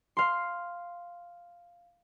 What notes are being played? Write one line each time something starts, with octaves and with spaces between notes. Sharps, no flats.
F5 C6